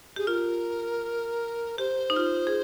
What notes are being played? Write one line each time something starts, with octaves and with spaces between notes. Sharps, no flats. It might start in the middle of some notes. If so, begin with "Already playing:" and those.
G4 G#4
F4 A#4
G4 C5
D#4
F4
G#4